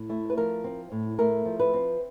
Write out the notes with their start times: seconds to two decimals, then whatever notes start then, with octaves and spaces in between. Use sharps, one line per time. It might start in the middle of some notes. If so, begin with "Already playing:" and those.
Already playing: A2
0.09 A3 E4
0.30 B4
0.37 F3 A#4
0.64 C4
0.92 A2
1.19 A3 A#4
1.46 F3
1.60 B4
1.73 C4